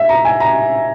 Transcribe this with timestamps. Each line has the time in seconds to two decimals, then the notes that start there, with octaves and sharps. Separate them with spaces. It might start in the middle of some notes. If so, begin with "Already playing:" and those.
Already playing: E5
0.09 A#5
0.25 G#5
0.40 A#5